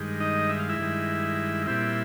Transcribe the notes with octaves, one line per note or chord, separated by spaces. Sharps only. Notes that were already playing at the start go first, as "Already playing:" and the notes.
Already playing: G2 D#3 G#3
D#4 D#5
E5
F5
E4 E5
G2 D#3 G#3
A#2 G3 C4 E4 E5